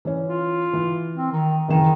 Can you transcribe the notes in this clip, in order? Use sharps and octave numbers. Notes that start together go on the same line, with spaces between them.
E3 C#4
F4
E3
C4
D#3
F#1 D#3 E3 E7